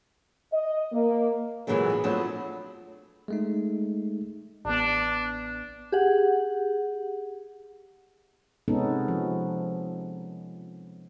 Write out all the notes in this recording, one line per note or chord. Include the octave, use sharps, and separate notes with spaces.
D#5
A#3
F#2 A#2 D3 E3 F#3 G#3
B3
F3 F#3 A3 B3 C4 D4
G#3 A3 D#4
A1 B3 D4
G4 G#4 F#5
C3 G#3 B3 C#4 D#4 A4
F3